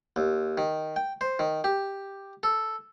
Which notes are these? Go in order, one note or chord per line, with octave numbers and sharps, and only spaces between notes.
D#2
D#3
G5
C5
D#3
G4
A4